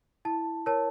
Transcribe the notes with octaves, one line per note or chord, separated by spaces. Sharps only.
E4 A5
A#4 C#5 A5